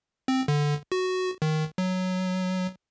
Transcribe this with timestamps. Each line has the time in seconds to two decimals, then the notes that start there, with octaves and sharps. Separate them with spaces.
0.28 C4
0.48 D3
0.92 F#4
1.42 D#3
1.78 F#3